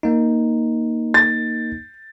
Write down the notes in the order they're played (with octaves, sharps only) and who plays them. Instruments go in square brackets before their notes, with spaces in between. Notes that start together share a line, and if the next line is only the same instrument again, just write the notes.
[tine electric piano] A#3 D#4
[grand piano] A6